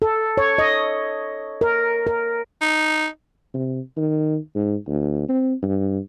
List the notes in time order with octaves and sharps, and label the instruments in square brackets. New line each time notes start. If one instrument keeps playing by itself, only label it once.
[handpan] A4
C#5
D#5
A#4
A#4
[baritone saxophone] D#4
[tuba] C3
D#3
G#2
D2
C4
G2